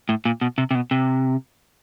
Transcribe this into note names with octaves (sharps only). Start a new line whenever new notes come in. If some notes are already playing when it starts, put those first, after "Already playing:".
A2
A#2
B2
C3
C3
B2
C3